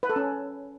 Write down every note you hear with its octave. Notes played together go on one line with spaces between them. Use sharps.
B4
A4
C#4